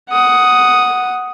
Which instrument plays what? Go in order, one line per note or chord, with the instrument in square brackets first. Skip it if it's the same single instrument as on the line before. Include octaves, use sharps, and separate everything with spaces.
[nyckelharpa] F#5 D#6